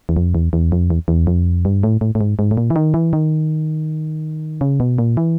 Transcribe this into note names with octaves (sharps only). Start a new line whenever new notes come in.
E2
F2
E2
E2
F2
E2
E2
F2
G2
A2
A2
A2
G#2
G#2
A2
A#2
E3
D#3
E3
D#3
C#3
B2
A#2
E3